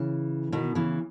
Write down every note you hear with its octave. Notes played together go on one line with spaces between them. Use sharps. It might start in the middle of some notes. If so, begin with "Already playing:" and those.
Already playing: C#3 E3
B2 D#3
C#3 E3